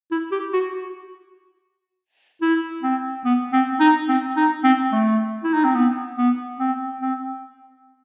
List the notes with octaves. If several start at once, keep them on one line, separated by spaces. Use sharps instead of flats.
E4
G4
F#4
E4
C4
B3
C4
D#4
C4
D#4
C4
A3
E4
D#4
C4
B3
B3
C4
C4